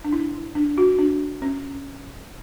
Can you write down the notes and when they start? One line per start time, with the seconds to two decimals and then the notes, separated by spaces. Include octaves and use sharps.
0.05 D4
0.12 E4
0.55 D4
0.78 F#4
0.99 D4
1.42 C#4